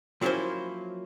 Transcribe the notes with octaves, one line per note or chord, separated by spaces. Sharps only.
F3 F#3 A#3 C#4 E4 C5